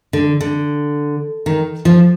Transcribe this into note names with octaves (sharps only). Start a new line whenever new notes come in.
D3
D3
D#3
F3